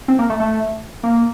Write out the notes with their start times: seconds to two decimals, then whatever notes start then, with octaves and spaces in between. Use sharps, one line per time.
0.08 C4
0.19 A#3
0.30 A3
0.40 A3
1.03 A#3